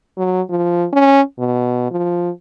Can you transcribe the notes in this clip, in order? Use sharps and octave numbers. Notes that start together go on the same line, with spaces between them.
F#3
F3
C#4
B2
F3